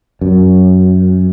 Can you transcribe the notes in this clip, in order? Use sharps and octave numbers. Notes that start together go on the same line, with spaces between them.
F#2